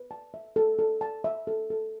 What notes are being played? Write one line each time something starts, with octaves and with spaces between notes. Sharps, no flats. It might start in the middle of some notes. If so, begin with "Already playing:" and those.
Already playing: B4
A5
E5
A4
A4
A5
E5
A4
A4